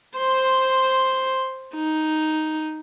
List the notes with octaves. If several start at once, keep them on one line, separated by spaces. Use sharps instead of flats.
C5 C6
D#4